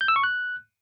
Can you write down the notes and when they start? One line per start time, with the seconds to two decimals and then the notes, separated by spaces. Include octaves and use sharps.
0.01 G6
0.08 E6
0.16 C#6
0.24 F#6